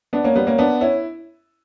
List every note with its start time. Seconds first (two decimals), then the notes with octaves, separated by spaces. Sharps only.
0.13 B3 D4
0.24 A#3 C#4
0.36 G3 B3
0.47 A#3 C#4
0.58 B3 D4
0.81 C#4 E4